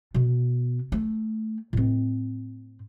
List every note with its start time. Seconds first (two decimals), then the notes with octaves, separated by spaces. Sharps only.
0.14 B2 B3
0.92 A3
1.73 A2 C4